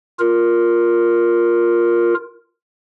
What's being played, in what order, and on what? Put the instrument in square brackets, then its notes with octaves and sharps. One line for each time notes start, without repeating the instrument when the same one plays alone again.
[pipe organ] F4 A#4